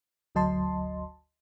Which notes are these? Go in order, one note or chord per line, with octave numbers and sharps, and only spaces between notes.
G1 D2 F#3 D#5 A5 C6